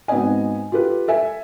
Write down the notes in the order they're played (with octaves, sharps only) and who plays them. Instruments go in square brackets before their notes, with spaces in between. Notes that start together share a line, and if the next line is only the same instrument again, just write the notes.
[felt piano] G#2 B3 C4 F#4 D#5 G#5
F4 G4 A4 B4
A4 E5 G#5